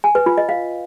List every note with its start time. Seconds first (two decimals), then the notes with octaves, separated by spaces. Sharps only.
0.04 G#5
0.15 B4
0.26 F4
0.38 D#5
0.49 F5